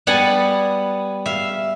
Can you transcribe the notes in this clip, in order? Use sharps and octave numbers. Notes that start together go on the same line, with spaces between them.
G3 B3 F#5 G#5 A5
E5 F5